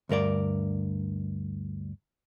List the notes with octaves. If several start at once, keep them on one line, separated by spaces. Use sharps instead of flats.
D2 G2 A#4 D5